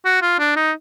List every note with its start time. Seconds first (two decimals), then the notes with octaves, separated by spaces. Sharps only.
0.05 F#4
0.22 F4
0.39 D4
0.56 D#4